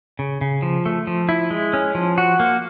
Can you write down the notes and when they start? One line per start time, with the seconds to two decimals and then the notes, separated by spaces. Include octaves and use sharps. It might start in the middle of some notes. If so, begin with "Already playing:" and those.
0.19 C#3
0.41 C#3
0.62 F3
0.86 A3
1.07 F3
1.29 E4
1.51 G#3
1.73 C#4
1.95 F3
2.18 F#4
2.40 A#3